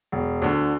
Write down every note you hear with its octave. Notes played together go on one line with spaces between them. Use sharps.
E1
D2 D3